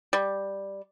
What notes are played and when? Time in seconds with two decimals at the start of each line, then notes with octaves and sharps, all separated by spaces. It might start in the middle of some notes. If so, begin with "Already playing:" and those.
0.13 G3